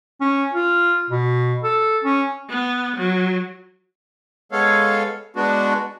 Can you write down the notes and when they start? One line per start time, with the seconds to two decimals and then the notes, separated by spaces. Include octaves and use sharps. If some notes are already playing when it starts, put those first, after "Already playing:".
0.21 C#4
0.53 F4
1.10 B2
1.63 A4
2.04 C#4
2.50 B3
2.97 F#3
4.52 G#3 B3 A4 C#5 F5
5.36 G#3 B3 D4 F#4